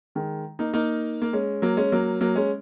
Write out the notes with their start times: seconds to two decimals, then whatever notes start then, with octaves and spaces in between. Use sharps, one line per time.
0.15 D#3 G#3
0.59 A#3 D#4
0.74 A#3 D#4
1.22 A#3
1.33 G#3 C#4
1.62 F#3 A#3
1.77 G#3 C#4
1.92 F#3 A#3
2.21 F#3 A#3
2.35 G#3 C#4